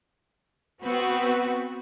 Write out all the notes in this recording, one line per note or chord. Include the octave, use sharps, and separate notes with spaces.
B3 C4 F#4 B4